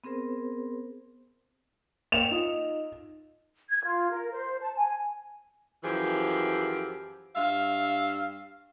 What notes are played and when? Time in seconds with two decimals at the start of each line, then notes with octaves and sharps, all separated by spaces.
0.04 B3 C4 G#4 A#4 C5
2.12 A#3 G5 C#7 E7 F7
2.31 D#4 F4 D#5
3.70 G#6
3.84 F4
4.11 A#4
4.32 C5
4.62 A5
4.76 G#5
5.83 F#2 E3 F3 G4 G#4
7.35 G2 E5 F5